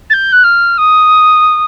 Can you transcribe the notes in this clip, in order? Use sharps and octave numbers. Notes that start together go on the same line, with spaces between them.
A6
G6
F#6
F6
D#6